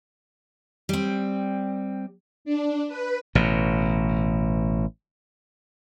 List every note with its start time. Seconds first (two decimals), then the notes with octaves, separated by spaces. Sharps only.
0.89 G3 C4
2.45 D4
2.88 B4
3.35 A1 B2